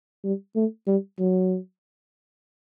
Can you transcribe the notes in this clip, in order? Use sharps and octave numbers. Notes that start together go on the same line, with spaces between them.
G3
A3
G3
F#3